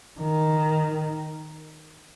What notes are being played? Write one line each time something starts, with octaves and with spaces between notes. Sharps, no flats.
D#3